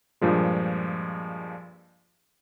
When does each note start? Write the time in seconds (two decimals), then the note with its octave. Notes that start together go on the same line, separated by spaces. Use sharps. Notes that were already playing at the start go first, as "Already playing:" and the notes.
0.21 G2 A#2 F3 G#3